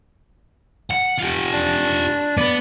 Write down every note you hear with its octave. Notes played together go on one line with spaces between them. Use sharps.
F#5
F4 G4
D4
B3 D5